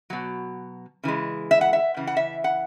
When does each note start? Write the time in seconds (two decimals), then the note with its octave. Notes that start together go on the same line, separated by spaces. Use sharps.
0.10 B2 F#3
1.03 C#3 E3 G#3
1.51 E5
1.61 F#5
1.73 E5
1.97 C#3 E3
2.07 F#5
2.17 E5
2.44 F#5